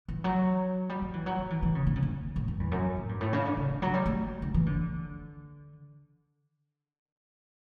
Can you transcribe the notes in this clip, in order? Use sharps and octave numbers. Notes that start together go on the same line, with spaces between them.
E3
F#3
G3
F#3
E3
F#3
F#3
E3
E3
C#3
D3
C#3
D3
A2
G2
E2
F#2
A2
G2
A2
C#3
D3
C#3
D3
F#3
G3
A3
D3
E3
D3